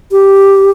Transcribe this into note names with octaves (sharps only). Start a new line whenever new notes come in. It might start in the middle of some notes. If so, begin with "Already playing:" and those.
G4